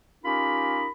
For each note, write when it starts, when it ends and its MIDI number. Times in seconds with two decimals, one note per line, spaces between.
0.24 0.88 61
0.24 0.88 63
0.24 0.88 65
0.24 0.88 67
0.24 0.88 70
0.24 0.88 83